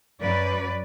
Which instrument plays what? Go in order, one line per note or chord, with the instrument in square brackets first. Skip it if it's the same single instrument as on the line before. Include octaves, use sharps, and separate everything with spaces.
[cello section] F#2 B4 D5